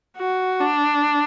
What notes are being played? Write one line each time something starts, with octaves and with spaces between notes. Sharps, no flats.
F#4
D4